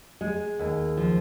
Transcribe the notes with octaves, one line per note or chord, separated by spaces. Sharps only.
G#3
D#2
F3